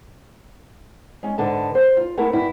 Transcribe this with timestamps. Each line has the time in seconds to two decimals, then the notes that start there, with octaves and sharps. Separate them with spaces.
1.23 G#3 C#4
1.38 G#2 D3 B3 A5
1.75 C5
1.97 F4
2.17 A3 B3 E4 A#4
2.33 G2 E4 F#4